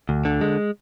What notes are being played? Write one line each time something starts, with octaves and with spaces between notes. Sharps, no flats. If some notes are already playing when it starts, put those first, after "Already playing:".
D2
D3
G#3